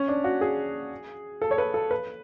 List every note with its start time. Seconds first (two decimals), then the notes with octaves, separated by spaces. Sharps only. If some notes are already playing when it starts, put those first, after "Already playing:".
Already playing: C#4
0.08 D4
0.24 F#4
0.41 G#4
1.42 A4
1.51 C#5
1.58 B4
1.74 A4
1.91 B4